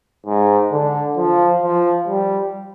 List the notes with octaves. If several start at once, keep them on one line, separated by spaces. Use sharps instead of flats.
G#2
D3
F3
F3
G3